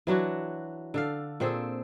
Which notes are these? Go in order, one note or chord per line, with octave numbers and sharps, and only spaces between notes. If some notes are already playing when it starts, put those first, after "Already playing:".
E3 F#3 D4 F#4
D3 A4 F5
A#2 C4 G#4 A4